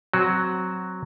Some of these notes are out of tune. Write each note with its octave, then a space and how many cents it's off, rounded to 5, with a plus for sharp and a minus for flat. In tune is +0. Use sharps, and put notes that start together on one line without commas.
F#3 +0 C4 +0 F#4 +10